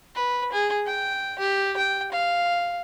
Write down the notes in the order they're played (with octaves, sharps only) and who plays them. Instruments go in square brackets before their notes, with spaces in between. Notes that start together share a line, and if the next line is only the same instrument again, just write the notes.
[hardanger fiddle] B4
G#4
G5
G4
G5
F5